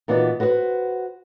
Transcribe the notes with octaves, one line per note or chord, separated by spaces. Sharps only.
A#2 E3 B3 D#4 F#4 D5
F#4 B4 C5 D#5 F#5